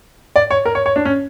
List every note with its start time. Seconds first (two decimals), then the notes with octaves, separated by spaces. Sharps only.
0.36 D5
0.51 C#5
0.66 A#4
0.75 C#5
0.86 C#5
0.96 D4
1.05 C#4